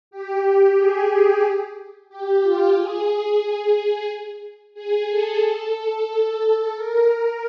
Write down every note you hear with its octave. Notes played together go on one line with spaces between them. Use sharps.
G4
G#4
G4
F4
G#4
G#4
G#4
A4
A#4